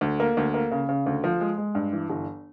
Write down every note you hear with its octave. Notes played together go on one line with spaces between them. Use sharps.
D2
A#3
D2
A#3
C#3
C#3
D2
F3
G#3
G#3
G2
E3
G1